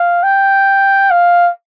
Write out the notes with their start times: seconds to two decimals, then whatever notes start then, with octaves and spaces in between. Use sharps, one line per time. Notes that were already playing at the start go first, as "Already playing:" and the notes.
Already playing: F5
0.23 G5
1.11 F5